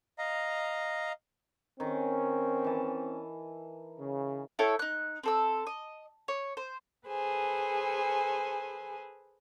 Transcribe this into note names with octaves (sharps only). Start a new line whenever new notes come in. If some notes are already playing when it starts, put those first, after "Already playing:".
D#5 F5 A#5
D#3 C4 C#4
E3 A5
C#3
E4 A4 C#5 G5
D#4 F#6
C4 A4 E6
D#5
C#5
C5
G#4 A4 B4 C5 G#5